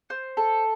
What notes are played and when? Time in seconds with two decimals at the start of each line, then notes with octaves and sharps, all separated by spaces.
0.10 C5
0.37 A4